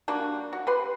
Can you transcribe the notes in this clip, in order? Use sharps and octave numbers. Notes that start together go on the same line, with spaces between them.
G3 A#3 D4 F#4
F#4
G4 B4 C6